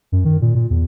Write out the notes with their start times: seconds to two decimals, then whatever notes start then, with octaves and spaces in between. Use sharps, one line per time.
0.12 F#2
0.25 D#3
0.41 A#2
0.55 A#2
0.70 E2